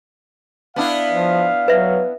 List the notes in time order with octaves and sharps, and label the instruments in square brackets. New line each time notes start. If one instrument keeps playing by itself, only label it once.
[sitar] B3 D4 E4 [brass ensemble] F5
[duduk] F3
[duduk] F#3 [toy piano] B4 E5